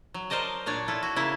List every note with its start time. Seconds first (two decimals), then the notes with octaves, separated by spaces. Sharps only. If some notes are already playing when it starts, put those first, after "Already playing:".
0.14 F#3
0.30 A#4 C5 D5 D#5 A5
0.66 A#2 D4 C#5 D5
0.88 E4 F4 A4
1.03 F#4
1.16 C#3 A#3 E4